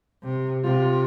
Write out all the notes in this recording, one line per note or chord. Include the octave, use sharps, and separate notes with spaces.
C3
C3 F4